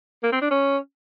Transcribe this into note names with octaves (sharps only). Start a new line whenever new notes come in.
A#3
C4
D4
C#4